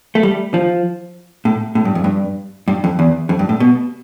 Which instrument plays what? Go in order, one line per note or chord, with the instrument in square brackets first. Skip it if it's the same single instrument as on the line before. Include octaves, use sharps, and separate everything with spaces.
[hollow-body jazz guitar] A3
G3
F3
A2
A2
G2
F2
G2
G2
F2
E2
F2
G2
A2
B2